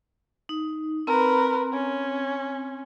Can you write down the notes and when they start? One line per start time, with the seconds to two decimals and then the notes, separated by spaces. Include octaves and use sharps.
0.49 D#4
1.07 C4 A#4 B4
1.73 C#4